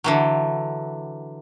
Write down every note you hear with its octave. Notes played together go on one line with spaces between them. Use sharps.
D3 E3 F#3